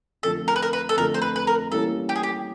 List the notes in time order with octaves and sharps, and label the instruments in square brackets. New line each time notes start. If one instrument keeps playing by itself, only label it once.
[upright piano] F2 D3 F3 A3 [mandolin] A4
[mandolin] A#4
B4
A#4
B4
A4
[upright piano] F2 D3 F3 A3 [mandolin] A#4
[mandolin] C5
B4
B4
A#4
[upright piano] E3 G3 A#3 C#4 E4 [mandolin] A4
[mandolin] G4
G#4
G4